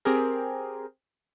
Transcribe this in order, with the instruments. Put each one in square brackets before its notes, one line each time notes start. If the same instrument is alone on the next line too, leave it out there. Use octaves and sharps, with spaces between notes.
[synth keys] C4 G4 G#4 A#4